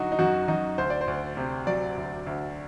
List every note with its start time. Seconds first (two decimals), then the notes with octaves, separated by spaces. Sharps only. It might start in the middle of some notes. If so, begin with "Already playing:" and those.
Already playing: D3 F#3 D#4 F#4
0.12 D#4
0.19 F#2 F#4
0.48 F#2 D#4
0.78 D2 C5
0.90 D5
1.01 C5
1.08 D2
1.37 C3
1.67 F#3 D5
1.97 D2
2.27 D2